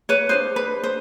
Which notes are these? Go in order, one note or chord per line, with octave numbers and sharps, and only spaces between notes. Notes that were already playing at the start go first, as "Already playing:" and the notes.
B4 C#5
D4 G4 B4 C5
B4
C5